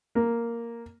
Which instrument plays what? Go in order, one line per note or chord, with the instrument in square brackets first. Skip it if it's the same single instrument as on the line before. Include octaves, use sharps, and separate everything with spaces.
[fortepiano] A#3